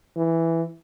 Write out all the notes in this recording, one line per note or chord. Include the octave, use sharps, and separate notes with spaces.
E3